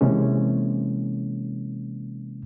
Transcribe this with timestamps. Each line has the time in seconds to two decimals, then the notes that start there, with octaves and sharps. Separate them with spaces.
0.01 C3 E3 G#3 A#3 C#4